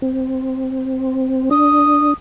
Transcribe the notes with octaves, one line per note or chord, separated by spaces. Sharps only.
C4
D4 D#6